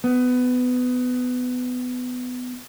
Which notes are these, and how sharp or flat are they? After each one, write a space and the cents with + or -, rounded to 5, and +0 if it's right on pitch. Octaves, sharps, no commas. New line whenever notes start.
B3 +20